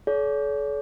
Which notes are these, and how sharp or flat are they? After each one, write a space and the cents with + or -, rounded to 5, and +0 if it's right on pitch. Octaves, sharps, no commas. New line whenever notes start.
A4 -45 C#5 +45